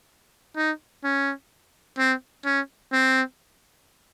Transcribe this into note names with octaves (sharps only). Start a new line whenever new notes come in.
D#4
C#4
C4
C#4
C4